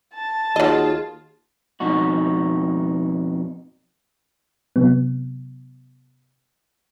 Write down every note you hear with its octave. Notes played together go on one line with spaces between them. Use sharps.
A5
D#2 F#3 F4 G#4 D#5
F2 B2 D#4 F#4
C3 F#3 B3